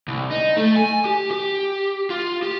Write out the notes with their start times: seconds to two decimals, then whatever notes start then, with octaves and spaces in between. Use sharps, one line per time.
0.08 C2
0.31 D#4
0.57 A3
0.76 G#5
1.05 G4
1.31 G4
2.10 F4
2.42 G4